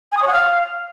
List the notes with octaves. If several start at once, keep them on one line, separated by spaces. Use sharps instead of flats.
G#5
D#6
C#5
F#5
F5